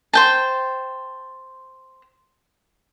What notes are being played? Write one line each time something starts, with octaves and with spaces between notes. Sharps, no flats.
C5 G5 A5